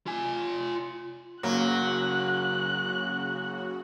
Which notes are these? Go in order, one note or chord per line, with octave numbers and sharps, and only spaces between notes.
F4 G#5
F#1 C#3 F#3 A#3 F#4 F#6